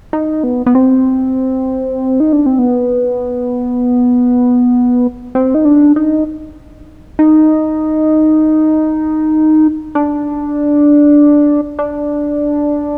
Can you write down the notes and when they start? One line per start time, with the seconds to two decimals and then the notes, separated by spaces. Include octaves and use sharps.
0.13 D#4
0.44 B3
0.66 B3
0.75 C4
2.20 D#4
2.33 D4
2.46 C4
2.59 B3
5.35 C4
5.54 D#4
5.65 D4
5.96 D#4
7.19 D#4
9.95 D4
11.79 D4